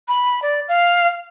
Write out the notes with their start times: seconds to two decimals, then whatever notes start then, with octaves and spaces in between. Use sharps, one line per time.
0.08 B5
0.42 D5
0.68 F5